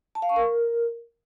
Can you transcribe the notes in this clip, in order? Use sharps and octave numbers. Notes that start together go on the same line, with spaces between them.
A5
F5
C#6
A#4